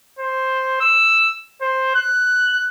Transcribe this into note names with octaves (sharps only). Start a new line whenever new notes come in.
C5
E6
C5
F#6